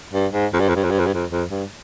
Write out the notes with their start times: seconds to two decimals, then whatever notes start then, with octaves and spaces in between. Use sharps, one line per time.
0.13 G2
0.33 G#2
0.53 F2
0.60 G2
0.69 F2
0.76 G2
0.84 F2
0.91 G2
0.99 F2
1.06 G2
1.14 F2
1.30 F2
1.50 G2